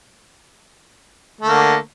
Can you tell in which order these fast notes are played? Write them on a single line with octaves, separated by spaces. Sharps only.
A3 D3 A#3